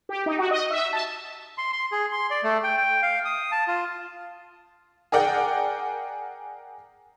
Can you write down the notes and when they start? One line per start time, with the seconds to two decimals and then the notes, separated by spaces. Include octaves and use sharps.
0.09 G4
0.26 D#4
0.38 F#4
0.51 D#5
0.70 E5
0.93 A5
1.58 C6
1.73 C6
1.92 G#4
2.12 C6
2.31 D5
2.43 A3
2.64 G5
2.78 G5
3.03 F5
3.25 D#6
3.52 A5
3.68 F4
5.12 G#4 A#4 D5 F#5 G5